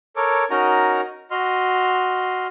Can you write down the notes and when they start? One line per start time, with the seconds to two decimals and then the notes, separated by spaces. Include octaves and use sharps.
0.16 A4 A#4 C#5 D6
0.51 C#4 D#4 F#4 A#4 D#5 A#5
1.31 F#4 D#5 C6 F6